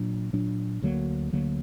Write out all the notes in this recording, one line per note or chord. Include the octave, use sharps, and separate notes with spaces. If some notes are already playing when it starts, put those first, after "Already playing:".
Already playing: A#2 F#3 D4
A#2 F#3 D4
D2 D3 F#3 A#3
D2 D3 F#3 A#3